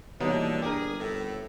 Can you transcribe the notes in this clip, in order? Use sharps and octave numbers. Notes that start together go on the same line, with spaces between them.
B2 D3 E3 G3 A#3 D#4 C#5 A5
G1 C2 D4 G4 G#4 A#4
A2 A4